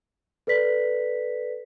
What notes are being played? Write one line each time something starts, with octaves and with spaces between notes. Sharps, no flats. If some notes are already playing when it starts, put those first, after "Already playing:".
A4 B4 D5 B6